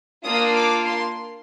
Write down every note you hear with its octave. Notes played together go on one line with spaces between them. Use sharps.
A#3 D4 F4 D#6
D6
C6